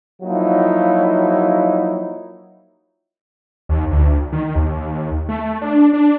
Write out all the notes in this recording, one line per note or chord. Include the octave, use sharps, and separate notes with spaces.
F3 F#3 A#3 D#4 E4 F#4
D#2
D2
D#3
D#2
A3
D4
D4